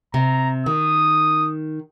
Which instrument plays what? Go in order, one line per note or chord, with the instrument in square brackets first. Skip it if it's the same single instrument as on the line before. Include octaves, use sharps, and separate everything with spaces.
[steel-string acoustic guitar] C3 [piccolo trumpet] A#5
[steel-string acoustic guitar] D#3 [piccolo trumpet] D#6